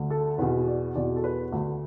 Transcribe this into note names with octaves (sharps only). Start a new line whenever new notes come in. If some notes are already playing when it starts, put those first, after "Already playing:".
Already playing: D2 D3
A4
E2 B2 B4
D5
E2 B2 D5
A4
B4
D2 D3